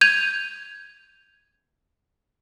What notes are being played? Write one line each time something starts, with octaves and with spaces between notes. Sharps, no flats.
G6 G#6 D#7 F7